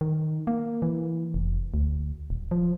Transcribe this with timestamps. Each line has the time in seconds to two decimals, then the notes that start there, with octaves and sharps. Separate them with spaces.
0.01 D#3
0.47 A#3
0.82 E3
1.34 F1
1.74 D2
2.30 D#1
2.51 F3